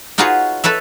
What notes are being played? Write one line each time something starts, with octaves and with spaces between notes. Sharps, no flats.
D#4 F4 F#4 G#4 B4 C#5
A4 B4 C#5 E5